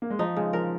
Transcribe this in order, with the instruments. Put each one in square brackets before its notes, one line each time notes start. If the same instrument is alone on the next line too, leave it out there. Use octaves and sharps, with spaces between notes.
[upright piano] A#3
G#3
[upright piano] F3 [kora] D#4
[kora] C#3 [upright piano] G#3
[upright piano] F3 [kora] A#4